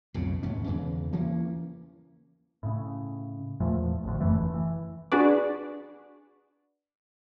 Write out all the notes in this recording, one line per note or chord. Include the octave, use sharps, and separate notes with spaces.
B1 F2 A2 C#3
D#2 G#2 C#4
E2 C#3 E3
E3 A#3 C#4
A2 C#3
E2 A#2 F3 A3
A1 D2
F1 F#2 E3 A3
E3
D4 F#4 G#4 B4 D5